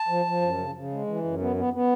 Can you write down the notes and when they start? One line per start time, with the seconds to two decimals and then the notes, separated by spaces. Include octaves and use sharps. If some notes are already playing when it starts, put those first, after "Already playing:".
Already playing: A5
0.08 F3
0.25 F3
0.41 F#2
0.58 C#3
0.75 C#3
0.91 G#3
1.07 E3
1.24 F#2
1.41 B3
1.56 B3
1.73 B3